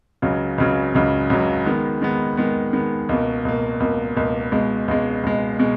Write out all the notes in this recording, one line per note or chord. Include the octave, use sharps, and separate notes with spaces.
C#2 C#3 F#3
C#2 C#3 F#3
C#2 C#3 F#3
C#2 C#3 F#3
D#3 G#3 B3
D#3 G#3 B3
D#3 G#3 B3
D#3 G#3 B3
C#2 B2 A#3
C#2 B2 A#3
C#2 B2 A#3
C#2 B2 A#3
C#2 B2 G#3
C#2 B2 G#3
C#2 B2 G#3
B2 G#3